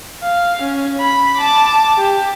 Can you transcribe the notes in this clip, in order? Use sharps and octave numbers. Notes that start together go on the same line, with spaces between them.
F5
C#4
B5
A5 D6
G4